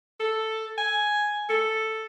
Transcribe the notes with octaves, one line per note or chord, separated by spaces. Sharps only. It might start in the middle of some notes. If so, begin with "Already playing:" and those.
A4
G#5
A4